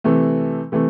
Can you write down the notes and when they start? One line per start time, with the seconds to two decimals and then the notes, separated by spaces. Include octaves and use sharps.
0.04 C3 E3 A3
0.72 C3 E3 A3